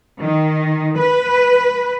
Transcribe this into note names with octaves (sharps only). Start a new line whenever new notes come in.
D#3
B4